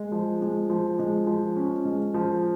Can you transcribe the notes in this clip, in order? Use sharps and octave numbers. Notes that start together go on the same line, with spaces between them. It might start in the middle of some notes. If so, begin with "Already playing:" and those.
Already playing: G#3
F3
G#3
F3
G#3
F3
C#4
G#3
F3